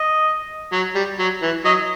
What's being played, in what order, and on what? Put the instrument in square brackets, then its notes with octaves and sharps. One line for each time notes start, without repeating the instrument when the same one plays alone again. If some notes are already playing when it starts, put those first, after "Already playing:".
Already playing: [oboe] D#5
[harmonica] F#3
G3
F#3
E3
[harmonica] F#3 [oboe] D#5